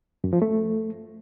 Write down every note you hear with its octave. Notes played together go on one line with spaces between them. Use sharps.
F#2
F3
A3